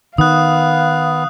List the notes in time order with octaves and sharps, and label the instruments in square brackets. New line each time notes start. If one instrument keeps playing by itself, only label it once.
[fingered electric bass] D#3 [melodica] B3 [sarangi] F5 [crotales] D#6 F#6